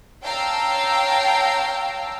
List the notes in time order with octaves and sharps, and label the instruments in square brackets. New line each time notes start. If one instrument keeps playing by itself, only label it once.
[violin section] C#5 F5 G5 A5 A#5 E6